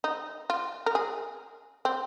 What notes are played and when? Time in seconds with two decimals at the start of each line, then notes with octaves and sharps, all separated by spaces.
0.04 D#4
0.50 F4
0.86 A#4
0.95 G#4
1.85 C4